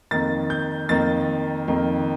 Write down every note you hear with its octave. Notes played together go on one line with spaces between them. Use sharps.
F2 D#3 A#3 A6
G6
F2 D#3 A#3 A6
F2 D#3 A#3